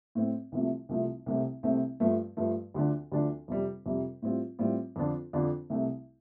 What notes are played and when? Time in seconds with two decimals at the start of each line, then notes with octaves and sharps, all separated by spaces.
0.15 A2 A3 C4
0.52 C2 C3 F3 A3
0.89 C2 C3 F3 A3
1.26 C2 C3 A3 C4
1.63 C2 C3 A3 C4
2.00 G2 F3 A3
2.37 G2 F3 A3
2.74 D2 D3 F3 D4
3.12 D2 D3 F3 D4
3.48 F2 C3 G3
3.86 F2 C3 G3
4.22 A2 G3 C4 F4
4.59 A2 G3 C4 F4
4.96 F2 D3 F3 D4 F4
5.33 F2 D3 F3 D4 F4
5.70 C2 C3 A3